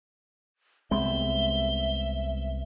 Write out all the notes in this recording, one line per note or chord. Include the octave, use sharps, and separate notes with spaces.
C2 G#3 B3 C4 E5 G7